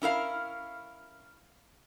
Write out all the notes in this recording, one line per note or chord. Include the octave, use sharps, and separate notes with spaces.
C#4 E4 A#4 F5